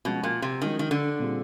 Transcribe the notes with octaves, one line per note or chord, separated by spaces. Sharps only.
B2 F3 G#3 C#4 F#4
A#2
C3
D#3 F3 G#3 C#4 F#4
D#3
D3
A#2 G3 C4 F4 G#4